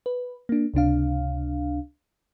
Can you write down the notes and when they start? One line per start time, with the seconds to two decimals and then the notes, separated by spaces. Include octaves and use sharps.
0.06 B4
0.49 A#3 D4
0.74 C#2 C3 D4 F5